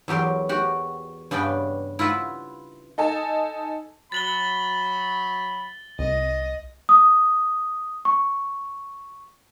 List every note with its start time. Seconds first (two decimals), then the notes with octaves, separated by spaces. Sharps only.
0.08 E2 F#3 G4 A#4 C6
0.49 F#4 G4 F#5
1.31 G2 C#3 B3 D4 G5
1.99 E4 F4 B4 E5 F#5
2.98 D#4 A4 G#5 A5
4.12 F#3 B5 A6 F#7 G7
5.99 C2 D#5
6.89 D#6
8.05 C#6